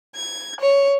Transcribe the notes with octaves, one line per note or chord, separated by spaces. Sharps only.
G#6
C#5